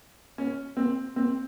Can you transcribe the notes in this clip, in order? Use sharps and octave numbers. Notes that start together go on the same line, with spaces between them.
C#4
C4
C4